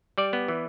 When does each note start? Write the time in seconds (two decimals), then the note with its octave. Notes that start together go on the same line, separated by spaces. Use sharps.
0.18 G3 D5
0.33 B3
0.48 E3